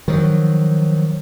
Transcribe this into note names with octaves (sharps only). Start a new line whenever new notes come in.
D#3 F3 F#3